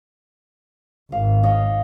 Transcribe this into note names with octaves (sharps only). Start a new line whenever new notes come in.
G#1 F5
C#5 D#5 F5